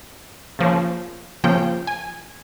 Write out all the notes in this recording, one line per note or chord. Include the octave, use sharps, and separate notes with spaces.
C#3 F3 A#3 C#4
C#3 F3 A#3 C#4 G5
G#5